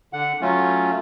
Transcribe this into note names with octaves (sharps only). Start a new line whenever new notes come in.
D3 F#5
F#3 A3 C#4 F4